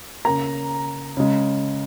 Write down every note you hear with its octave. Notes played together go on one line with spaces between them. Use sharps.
C#3 A#3 A#5
C#3 G#3